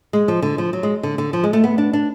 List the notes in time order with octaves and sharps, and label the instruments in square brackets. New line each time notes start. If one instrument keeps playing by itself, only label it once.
[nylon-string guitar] G#3
F3
D3
F3
F#3
G#3
D3
D3
F3
G#3
A3
B3
D4
D4